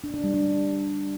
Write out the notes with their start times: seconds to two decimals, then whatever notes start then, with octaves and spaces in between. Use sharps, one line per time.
0.04 D4
0.14 D4
0.24 G3
0.34 D4